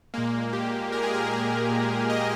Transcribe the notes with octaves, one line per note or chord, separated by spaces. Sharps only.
A#2 G#3 A#3
G4
A#2 G#3 A#4
G#4
A#4
G#4
A#2 G#3
D#5